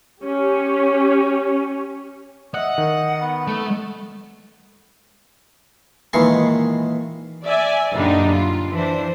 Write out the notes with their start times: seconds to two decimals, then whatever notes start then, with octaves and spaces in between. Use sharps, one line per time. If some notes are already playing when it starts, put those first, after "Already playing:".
0.24 C#4 G4
2.54 D#5 E5 F#5 D#6
2.78 D#3
3.21 B3
3.48 A3
6.13 A#2 D#3 E3 G#3 C6 C#6
7.43 D5 E5 G#5
7.93 F#2 A#2 D3 G3 D4 D#4
8.33 F4
8.72 E3 D4 C5